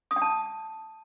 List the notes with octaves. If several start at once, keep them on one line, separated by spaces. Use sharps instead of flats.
D#6
G5
A5